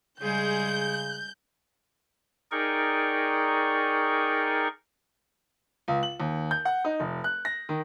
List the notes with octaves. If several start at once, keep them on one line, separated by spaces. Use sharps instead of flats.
C#3 G3 G#3 G#4 G6
D#4 G#4 A#4 D5 G5 C#6
C#2
F#7
D#2
G6
F#5
D#4
F1
F#6
A#6
D#3